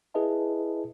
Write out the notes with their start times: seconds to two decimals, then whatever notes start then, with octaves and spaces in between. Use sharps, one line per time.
0.14 E4 G#4 B4 D#5 E5 A5